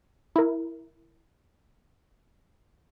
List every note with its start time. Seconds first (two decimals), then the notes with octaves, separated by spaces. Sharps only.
0.36 E4 A#4